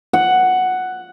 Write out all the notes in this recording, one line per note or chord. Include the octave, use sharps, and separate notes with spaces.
F#5